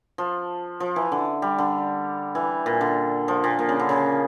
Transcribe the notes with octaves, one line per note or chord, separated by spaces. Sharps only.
F3
F3
E3
D3
G3
D3
E3
A#2
D3
F3
A#2
A#2
C#3
D3
C#3